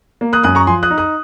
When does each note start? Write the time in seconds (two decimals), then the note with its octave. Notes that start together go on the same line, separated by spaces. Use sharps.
0.21 A#3
0.33 D#6 F#6
0.43 F#2 D#6 F#6
0.55 A#5 C#6
0.67 F3 G#5 C6
0.83 D#6 F#6
0.91 D#4
0.98 D#6 F#6